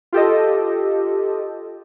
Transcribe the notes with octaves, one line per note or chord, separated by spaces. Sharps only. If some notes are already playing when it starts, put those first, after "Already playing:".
F4 G4 A4 D#5